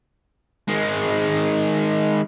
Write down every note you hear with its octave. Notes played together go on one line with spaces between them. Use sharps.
D#3 G#3